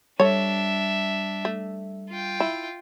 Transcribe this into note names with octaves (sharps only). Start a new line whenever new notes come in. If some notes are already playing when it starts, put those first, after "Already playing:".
G3 D4 A4 C#5 E5
A3
F4 G5
E4